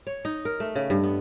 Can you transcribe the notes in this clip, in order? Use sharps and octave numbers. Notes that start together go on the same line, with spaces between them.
C#5
D#4
A#4
A3
C#3
G2
B3